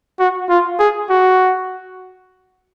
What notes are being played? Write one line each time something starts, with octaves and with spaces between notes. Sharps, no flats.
F#4
F4
G#4
F#4